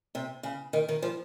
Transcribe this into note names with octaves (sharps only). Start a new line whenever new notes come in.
C3
C#3
D#3
D#3
F3